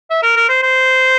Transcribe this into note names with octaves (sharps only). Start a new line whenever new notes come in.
E5
A#4
A#4
C5
C5